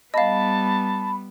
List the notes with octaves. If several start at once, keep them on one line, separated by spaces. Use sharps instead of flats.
G3 B3 D#5 F5 A5 B5